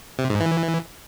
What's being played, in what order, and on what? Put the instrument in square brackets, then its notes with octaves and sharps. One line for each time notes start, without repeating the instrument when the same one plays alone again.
[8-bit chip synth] C3
G#2
E3